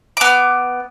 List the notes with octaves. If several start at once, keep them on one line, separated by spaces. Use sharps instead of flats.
B3 D6